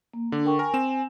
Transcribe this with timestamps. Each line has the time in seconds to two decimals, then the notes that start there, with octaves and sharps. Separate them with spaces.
0.14 A#3
0.32 D3 D4
0.45 A#4 G5 C#6
0.59 A#4 G#5
0.74 C4 E7